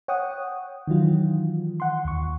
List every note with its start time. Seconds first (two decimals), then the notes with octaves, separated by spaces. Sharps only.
0.08 C#5 F#5 G5 D#6
0.87 D#3 E3 F#3 F4
1.80 F#5 C6
2.05 D#2 C#6